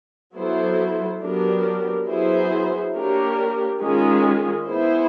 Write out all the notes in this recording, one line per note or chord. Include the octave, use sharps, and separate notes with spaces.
F#3 B3 E4 A4 C5
F#3 B3 D4 G4 A#4
F#3 B3 E4 G#4 C5
A#3 D4 G4 A#4 C#5
D#3 G#3 C#4 F4 G#4
B3 E4 G#4 C5